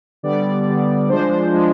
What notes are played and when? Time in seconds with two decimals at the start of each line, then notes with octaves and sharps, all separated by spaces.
0.23 D3 G3 B3 D5
0.67 D3 G3 B3
1.09 F3 G#3 D4 C5
1.52 F3 G#3 D4